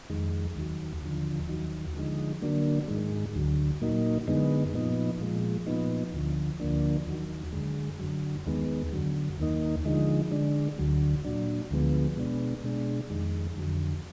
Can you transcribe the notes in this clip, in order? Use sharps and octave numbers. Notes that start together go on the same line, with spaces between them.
F2 D#3 G#3
D#2 D#3 F#3
D#2 D3 F3
D#2 D#3 F#3
D3 F3 G#3 D#4
D3 F#3 A#3 D4
G#2 D#3 G#3
D2 D3 F#3
A#2 F#3 A#3 D#4
F#2 D3 G#3 B3 D#4
A#2 F3 B3 D#4
A#2 F3 G#3
A#2 F3 B3 D#4
D2 D3 F3
D2 D3 F3 A#3 D4
D#2 D#3 F#3
F#2 D3 G#3
F#2 D3 F#3
D#2 D#3 G#3 B3
F#2 D3 F#3
D#2 D#3 A#3 D#4
D3 F3 G#3 D#4
D3 G#3 D4
D2 D3 F#3
A#2 F#3 D4
D2 D3 F3 G#3 B3
B2 G#3 B3 D4
B2 G#3 D4
F2 D#3 G#3
F2 D3 F#3